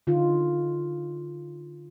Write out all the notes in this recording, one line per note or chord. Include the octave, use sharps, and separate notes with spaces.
D3 D#4 F4